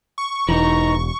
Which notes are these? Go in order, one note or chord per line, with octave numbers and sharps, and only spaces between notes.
C#6
E1 E3 D#4 A#5